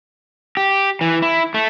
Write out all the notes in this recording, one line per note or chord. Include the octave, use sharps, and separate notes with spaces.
G4
E3
E4
A3